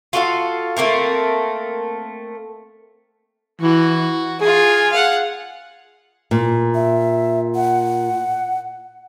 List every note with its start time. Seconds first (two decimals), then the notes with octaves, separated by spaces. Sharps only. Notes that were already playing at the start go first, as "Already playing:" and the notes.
0.13 F4 F#4 A4 F5
0.77 A3 A#3 C4 A#4
3.61 E3 F#4
4.41 F4 G#4 G#5
4.92 F5 F#5
6.31 A#2
6.75 E5
7.55 F#5